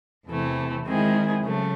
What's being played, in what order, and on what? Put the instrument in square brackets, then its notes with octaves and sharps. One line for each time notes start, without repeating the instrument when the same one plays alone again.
[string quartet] E2 C3 E3 A3
D#3 G#3 C4 E4 G#4
C#3 F#3 A3